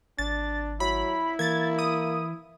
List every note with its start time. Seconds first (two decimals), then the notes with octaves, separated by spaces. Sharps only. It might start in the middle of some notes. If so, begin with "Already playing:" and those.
0.19 G#1 D4 A6
0.80 F#3 E4 B5
1.39 E3 A#3 G#6 A6
1.79 D#6